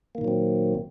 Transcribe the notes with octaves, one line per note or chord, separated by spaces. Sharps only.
A#2 D#3 F#3 A#3 C4